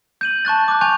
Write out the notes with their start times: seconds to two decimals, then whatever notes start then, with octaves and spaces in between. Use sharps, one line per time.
0.21 G6 D#7 F#7
0.45 A5 C#6 F#6 A6
0.68 D6 F#6
0.81 G#5 C#6 F#6 G6 F7